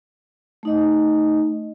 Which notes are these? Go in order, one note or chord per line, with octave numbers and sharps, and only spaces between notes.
A3 D#4 D#5